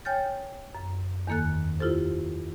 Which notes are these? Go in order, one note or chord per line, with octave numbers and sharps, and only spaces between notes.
C#5 G5 G#5 F6 G6 A6
F#2
E2 D#3 A#3 A4 F#6
E4 F4 G4 A4 C5